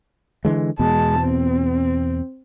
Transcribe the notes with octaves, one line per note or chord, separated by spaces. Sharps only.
D3 E3 G#3
E2 B2 G#3 A5
C4